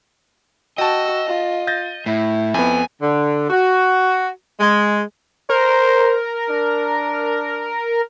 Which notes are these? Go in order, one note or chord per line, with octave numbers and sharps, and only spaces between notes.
F#4 D#5 G5 A5 E6
F4
G6 A6 A#6
A2 E4
F2 B3 G#5
D3
F#4
G#3
A#4 C5
D4